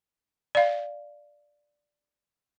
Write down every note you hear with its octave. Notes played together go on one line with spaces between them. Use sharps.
D5 F5